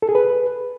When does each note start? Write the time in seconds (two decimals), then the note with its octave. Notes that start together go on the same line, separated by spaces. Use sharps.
0.02 A4
0.09 G#4
0.15 B4